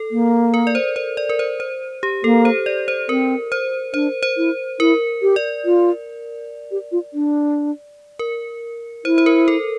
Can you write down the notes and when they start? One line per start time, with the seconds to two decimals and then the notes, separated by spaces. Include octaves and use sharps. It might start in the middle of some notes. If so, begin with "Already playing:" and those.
Already playing: A4
0.11 A#3
0.54 A#4
0.67 D5
0.75 C5
0.96 C5
1.17 D5
1.29 A#4
1.39 C5
1.60 C5
2.03 G4
2.23 A#3 A4
2.45 C5
2.66 D5
2.88 C5
3.09 C4 A#4
3.52 C5
3.94 D4 C5
4.23 C5
4.37 E4
4.79 E4 A#4
5.22 G4
5.36 D5
5.65 F4
6.71 G4
6.92 F4
7.14 D4
8.19 A#4
9.05 E4 C5
9.18 C5
9.26 A#4
9.48 A4